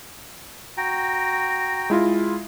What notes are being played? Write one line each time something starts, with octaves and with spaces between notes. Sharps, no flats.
F#4 G5 A#5
G#3 E4 F4